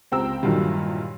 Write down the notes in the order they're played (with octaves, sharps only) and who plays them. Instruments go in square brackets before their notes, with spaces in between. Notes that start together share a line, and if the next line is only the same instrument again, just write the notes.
[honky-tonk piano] C#2 C4 G5 A#5 E6
G2 A#2 D#3 E3 F#3